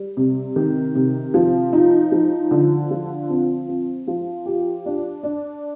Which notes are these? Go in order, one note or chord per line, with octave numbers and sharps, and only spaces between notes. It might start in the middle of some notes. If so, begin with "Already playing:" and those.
Already playing: G3
C3
D#3
C3
F3
D#4
F3
D3
F3
C4
C4
F3
G4
D4
D4